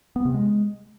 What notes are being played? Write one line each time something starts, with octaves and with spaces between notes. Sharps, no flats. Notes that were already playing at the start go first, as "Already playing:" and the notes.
B3
C3
G#3